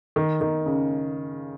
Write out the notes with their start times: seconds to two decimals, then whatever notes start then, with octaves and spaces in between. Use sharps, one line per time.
0.16 D#3
0.41 D#3
0.66 C#3